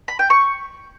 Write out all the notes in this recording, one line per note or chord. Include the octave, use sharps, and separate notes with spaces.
B5
G5
C#6